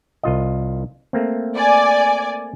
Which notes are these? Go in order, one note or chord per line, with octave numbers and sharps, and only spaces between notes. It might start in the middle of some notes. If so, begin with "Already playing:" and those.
C2 F4 D#5
A3 A#3 C4
D5 G#5